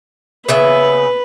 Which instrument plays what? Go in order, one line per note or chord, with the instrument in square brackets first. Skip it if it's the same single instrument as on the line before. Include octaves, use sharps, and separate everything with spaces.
[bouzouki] C#3 B3 E5 [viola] B4